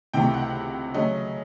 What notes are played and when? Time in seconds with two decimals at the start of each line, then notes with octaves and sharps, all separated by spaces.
0.14 C#2 C3 E3 A3 G5
0.34 F#5
0.94 C#3 F#3 A3 D#5